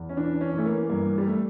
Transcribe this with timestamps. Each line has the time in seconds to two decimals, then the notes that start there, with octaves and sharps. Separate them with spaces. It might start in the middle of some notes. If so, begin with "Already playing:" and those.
Already playing: E2
0.09 C#4
0.17 E3 D4
0.41 C#4
0.54 E3 A3
0.65 A#3
0.89 G2 A#3
1.18 G3
1.27 A3